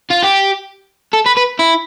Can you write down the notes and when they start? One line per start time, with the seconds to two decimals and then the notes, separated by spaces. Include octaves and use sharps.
0.10 F4
0.23 G4
1.13 A4
1.26 B4
1.37 B4
1.59 E4